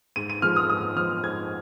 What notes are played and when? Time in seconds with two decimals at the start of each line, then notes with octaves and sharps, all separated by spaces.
0.16 G#2 D#7
0.30 D#7
0.42 F3 G#3 F6
0.56 D#6
0.69 G#2 D#6
0.96 F3 G#3 F6
1.23 G#2 G#6